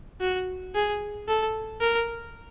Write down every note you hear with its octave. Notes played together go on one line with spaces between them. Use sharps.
F#4
G#4
A4
A#4